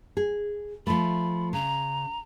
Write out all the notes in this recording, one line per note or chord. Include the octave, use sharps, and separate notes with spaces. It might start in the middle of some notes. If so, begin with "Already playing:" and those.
G#4
F3 A3 B5
C#3 A#5